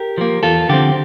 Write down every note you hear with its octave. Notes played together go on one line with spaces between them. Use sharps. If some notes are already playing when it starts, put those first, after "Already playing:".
Already playing: G4 A#4
F3 A#3
E2 F4 A4
D3 F3 C4 G4